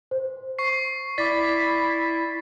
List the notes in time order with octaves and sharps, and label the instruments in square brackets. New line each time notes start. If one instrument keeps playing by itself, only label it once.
[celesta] C5
[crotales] C#6 C7
[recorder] E4 [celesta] D5 D6 [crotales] A6 B6